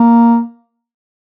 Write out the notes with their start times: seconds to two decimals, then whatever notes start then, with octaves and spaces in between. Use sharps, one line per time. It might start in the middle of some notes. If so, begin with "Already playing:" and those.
Already playing: A#3